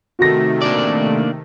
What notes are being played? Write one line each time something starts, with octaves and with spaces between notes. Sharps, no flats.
C3 D#3 A3 F#4 A#6
A#3 D4 D5